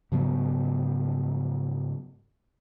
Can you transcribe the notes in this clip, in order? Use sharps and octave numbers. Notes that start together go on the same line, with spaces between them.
G#2 C#3 F#3 B3